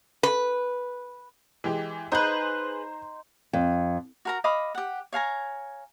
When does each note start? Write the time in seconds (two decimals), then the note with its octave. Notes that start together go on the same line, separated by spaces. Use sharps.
0.23 B4
1.64 E3 G#3 G4
2.12 D#4 G#4 B4 C5 A#5 C6 G6
3.53 F2
4.25 F#4 A#4 A#5
4.44 D#5 F5 B5 D6
4.75 G4 F#5
5.13 C#5 F5 G#5 A#5